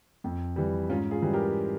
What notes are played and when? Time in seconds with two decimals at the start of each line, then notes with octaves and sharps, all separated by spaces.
0.24 F2
0.56 E3 G3
0.89 G#2 C#4 F4
1.11 F4 G#4
1.22 E3 G3
1.33 G4 A#4